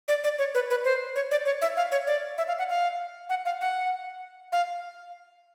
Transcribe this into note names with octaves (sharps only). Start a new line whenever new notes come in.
D5
D5
C#5
B4
B4
C5
C#5
D5
C#5
E5
F5
C#5
D5
E5
F5
F#5
F5
F#5
F5
F#5
F5